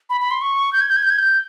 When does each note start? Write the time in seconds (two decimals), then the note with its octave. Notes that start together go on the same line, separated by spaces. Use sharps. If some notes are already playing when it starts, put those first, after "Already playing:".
0.10 B5
0.21 B5
0.31 C6
0.42 C#6
0.73 G6
0.81 G#6
0.89 G6
0.96 G#6
1.03 G6
1.10 G#6
1.18 G6